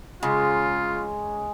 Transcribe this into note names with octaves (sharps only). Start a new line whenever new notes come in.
C#3 G#3 F4